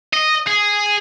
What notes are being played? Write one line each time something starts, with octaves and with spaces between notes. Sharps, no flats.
D#5
G#4